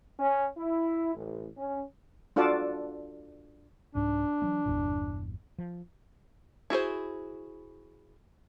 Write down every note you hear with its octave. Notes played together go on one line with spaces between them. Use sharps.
C#4
E4
A1
C#4
D4 F4 F#4 A4 D5 A5
C2 G#2 D4
E3 F#3 A#3
G1 E2 A#2
F3
E4 F#4 G#4 C5